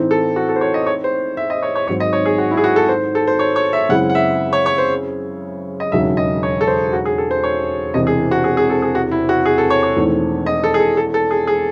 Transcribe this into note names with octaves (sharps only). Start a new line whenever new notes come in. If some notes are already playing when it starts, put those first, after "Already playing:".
Already playing: A2 E3 C4 D#4
A4
F#4
A4
C5
C#5
D#5
C#5
C5
E5
D#5
C#5
C#5
G#1 G#2 F#3 C4 C#5
D#5
C#5
G#4
F#4
E4
G#4
F#4
A4
C5
A4
C5
C#5
C#5
E5
F#2 C#3 G#3 C4 E4 F#5
F#5
E5
C#5
C#5
C5
D#5
E1 D#2 C#3 F#3 E5
D#5
C#5
A4
C5
F#4
G#4
A4
C5
C#5
E1 E2 C3 E3 D#5
G#4
F#4
G#4
G#4
A4
G#4
F#4
E4
F#4
G#4
A4
C#5
C#5
E1 E2 D#3 A3 C4
D#5
A4
G#4
A4
A4
A4
G#4
G#4